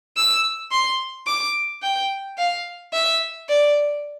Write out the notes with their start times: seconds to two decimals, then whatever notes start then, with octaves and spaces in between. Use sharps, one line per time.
0.17 E6
0.72 C6
1.27 D6
1.82 G5
2.38 F5
2.93 E5
3.49 D5